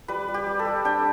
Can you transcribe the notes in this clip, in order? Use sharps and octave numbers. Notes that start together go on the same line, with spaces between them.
G3 B4
G3
G4
G3
A4
G3
D4 G5